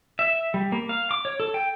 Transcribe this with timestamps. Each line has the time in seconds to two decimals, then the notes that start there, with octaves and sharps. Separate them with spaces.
0.19 E5
0.54 G3
0.72 A#3
0.89 F5
1.11 D6
1.25 C#5
1.40 A4
1.54 G5